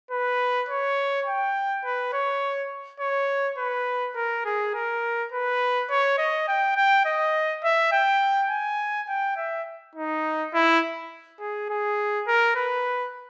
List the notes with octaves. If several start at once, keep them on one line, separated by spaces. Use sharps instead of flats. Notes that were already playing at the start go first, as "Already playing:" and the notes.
B4
C#5
G5
B4
C#5
C#5
B4
A#4
G#4
A#4
B4
C#5
D#5
G5
G5
D#5
E5
G5
G#5
G5
E5
D#4
E4
G#4
G#4
A#4
B4